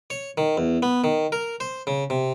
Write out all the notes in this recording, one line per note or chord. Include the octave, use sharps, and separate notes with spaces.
C#5
D#3
E2
B3
D#3
A#4
C5
C#3
C3